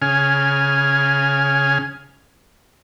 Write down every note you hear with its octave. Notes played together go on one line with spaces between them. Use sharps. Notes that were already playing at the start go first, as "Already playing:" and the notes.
C#3 G#5 F6